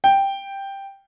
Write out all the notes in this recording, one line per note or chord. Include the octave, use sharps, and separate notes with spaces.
G5